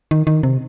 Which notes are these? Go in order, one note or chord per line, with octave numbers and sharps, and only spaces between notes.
D#3
D#3
C3